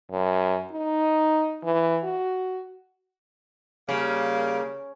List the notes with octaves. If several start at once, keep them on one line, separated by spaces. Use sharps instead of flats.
F#2
D#4
E3
F#4
C#3 G3 A#3